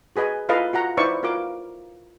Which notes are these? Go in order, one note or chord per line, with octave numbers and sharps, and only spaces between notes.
F#4 G#4 B4 D#5 G#5
E4 F4 A4 B4 D#5 F5
F4 F#4 F#5 A#5
D#4 E4 B4 C5 D5 C#6
F4 F#4 A#4 F5 D6